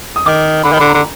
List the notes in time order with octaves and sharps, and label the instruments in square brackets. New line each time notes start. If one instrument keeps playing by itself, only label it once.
[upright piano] D#6
[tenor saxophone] D#3 [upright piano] D6
[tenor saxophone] D3 [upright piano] B5
[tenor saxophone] D#3
[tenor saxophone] D3 [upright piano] B5
[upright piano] A#5
[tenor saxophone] D3